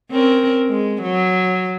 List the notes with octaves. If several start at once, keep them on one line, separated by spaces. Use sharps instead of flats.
C4 C#4 A#4
G#3
F#3